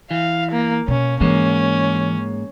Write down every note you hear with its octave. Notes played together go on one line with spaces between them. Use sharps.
E3 F5
A#3
B2 C#4
G#2 E3 G#3 A#3 C#4